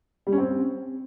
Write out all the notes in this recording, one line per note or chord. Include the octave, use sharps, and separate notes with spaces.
G3
C#4
C4